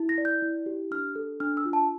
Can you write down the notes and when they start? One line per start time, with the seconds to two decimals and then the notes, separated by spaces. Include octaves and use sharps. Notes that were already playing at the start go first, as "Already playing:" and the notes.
Already playing: E4
0.09 A#6
0.18 D5
0.25 G6
0.42 E4
0.66 G4
0.91 D4 F6
1.16 A4
1.40 D4 F6
1.57 E6
1.65 F4
1.73 A5